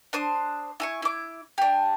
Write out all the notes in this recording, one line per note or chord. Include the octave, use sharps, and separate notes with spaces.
D4 C5 D#6
E4 G#5 C#6
E4 D6
D4 G4